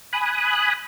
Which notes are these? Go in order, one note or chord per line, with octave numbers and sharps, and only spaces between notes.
G#5 B5 D#6 F#6